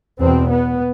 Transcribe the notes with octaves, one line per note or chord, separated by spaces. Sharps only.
E2 B2 C4
B3